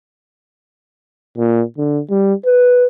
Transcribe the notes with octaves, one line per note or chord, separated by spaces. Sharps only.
A#2
D3
G3
B4